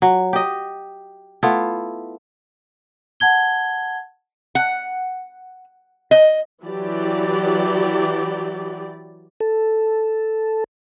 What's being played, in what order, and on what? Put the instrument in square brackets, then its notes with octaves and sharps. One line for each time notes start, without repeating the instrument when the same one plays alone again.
[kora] F#3
G4 D#5
A3 B3 E4 F4
[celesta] F#5 A5 G#6 G7
[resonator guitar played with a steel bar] F#5
D#5
[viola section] E3 F#3 G4 D5
[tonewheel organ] A4